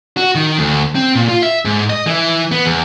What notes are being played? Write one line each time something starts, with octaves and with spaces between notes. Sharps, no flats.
F#4
D#3
D2
C4
A#2
F4
E5
G#2
D#5
E3
B3
E2